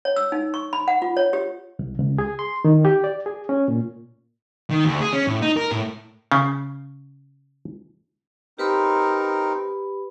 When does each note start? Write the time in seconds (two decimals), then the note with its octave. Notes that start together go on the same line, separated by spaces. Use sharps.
0.05 C#5
0.16 E6
0.32 D#4
0.54 C#6
0.73 B5
0.88 F#5
1.02 F4
1.17 C#5
1.33 G4
1.79 C2
1.99 C#2
2.18 G#4
2.39 C6
2.65 D#3
2.85 G4
3.04 D5
3.26 G#4
3.49 C#4
3.68 A#2
4.70 D#3
4.85 D2
5.01 G#4
5.13 C#4
5.27 A2
5.42 D#4
5.57 A#4
5.71 A2
6.32 C#3
8.59 C4 D#4 G4 A#4 B4 B5